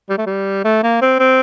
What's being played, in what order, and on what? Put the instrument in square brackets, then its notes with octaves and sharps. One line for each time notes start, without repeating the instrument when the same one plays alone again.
[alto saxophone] G3
A3
G3
A3
A#3
C4
C4